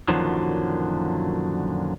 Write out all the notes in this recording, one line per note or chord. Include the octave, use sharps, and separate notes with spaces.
F#2 A#2 D3 D#3 F3 F#3